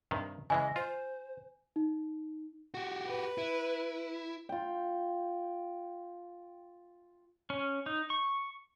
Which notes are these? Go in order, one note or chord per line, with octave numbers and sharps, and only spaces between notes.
G2 C3 D#3
C#3 E3 G#3 D#5 G#5
F4 C5
D#4
F#4 G4
B4
E4
F4 G5
C#4
D#4
C#6